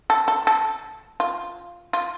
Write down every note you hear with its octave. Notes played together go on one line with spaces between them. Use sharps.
A4
A4
A4
F4
F4